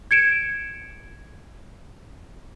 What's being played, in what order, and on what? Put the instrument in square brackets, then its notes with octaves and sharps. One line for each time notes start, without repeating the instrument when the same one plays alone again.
[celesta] G#6 C#7 D7 E7